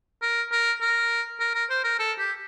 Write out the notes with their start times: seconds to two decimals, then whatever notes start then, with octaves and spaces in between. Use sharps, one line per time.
0.22 A#4
0.52 A#4
0.81 A#4
1.40 A#4
1.54 A#4
1.70 C5
1.84 A#4
1.99 A4
2.19 G4